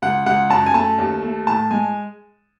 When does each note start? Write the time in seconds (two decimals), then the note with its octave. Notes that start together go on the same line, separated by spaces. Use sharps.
0.02 C#2 F#5
0.26 C#2 F#5
0.50 F#2 A5
0.66 G#5
0.74 A3 A5
0.98 D#2
1.23 A3
1.47 A2 A5
1.71 G#3 G#5